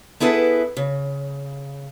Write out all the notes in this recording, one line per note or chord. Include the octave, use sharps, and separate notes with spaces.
B3 E4 G#4 A4 B4
C#3